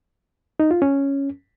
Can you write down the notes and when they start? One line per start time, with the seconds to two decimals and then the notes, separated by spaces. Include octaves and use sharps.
0.60 D#4
0.71 F4
0.82 C#4